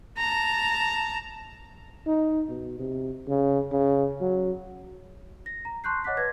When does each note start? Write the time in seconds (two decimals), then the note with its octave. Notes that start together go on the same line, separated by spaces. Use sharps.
0.18 A5 A#5
2.07 D#4
2.49 B2
2.79 C3
3.28 C#3
3.72 C#3
4.21 F#3
5.46 A#6
5.65 A#5
5.84 A5 C6 C#6 F#6 G6 C7
6.04 C#5 D#5 F#5 D6 F#6 B6
6.17 B4 G#6 A#6